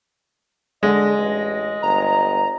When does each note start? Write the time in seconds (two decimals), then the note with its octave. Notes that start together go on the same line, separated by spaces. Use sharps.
0.83 D3 G#3 D#5
1.18 A1
1.82 G1 A#5